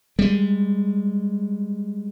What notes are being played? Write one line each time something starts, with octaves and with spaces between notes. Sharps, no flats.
G3 G#3